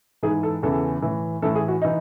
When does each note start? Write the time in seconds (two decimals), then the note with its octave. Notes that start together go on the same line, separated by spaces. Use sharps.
0.23 G#2 E3 G#4
0.43 A4
0.63 E2 C#3 E3 A4
1.02 A2 E3
1.42 A2 E3 A4
1.55 G#4
1.68 F#4
1.82 E3 D#4